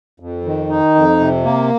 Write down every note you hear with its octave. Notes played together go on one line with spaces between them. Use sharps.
F2
D#3
D#4
F2
C3
A#3